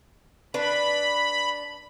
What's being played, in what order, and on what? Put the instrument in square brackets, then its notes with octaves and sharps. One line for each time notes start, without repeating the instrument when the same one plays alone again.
[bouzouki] D4 B4 [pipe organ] B5